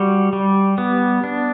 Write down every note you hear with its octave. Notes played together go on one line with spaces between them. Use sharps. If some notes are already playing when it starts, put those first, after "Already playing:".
Already playing: G3 F#4
G3
B3
D4